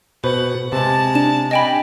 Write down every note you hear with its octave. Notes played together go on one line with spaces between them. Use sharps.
B2 B4 C5 F#5
C3 G#3 A5
D4 E7
G4 D#5 G5 G#5 B5